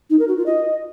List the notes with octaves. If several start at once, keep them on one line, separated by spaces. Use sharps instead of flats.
D#4
A#4
F#4
F4
D#5